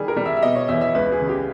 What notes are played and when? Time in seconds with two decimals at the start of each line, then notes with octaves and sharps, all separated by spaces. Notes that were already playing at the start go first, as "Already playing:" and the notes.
Already playing: D#3 G3 G#4
0.08 A#4
0.16 G3
0.25 E5
0.37 E5
0.42 B2 D#5
0.55 C#5
0.68 E2 E5
0.81 E5
0.95 C#2 B4
1.12 G#4
1.21 C#3
1.29 G4